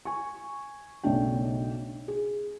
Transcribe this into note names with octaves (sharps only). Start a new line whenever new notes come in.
G#5 C#6
B1 C#3 A3 D4 G5
G#4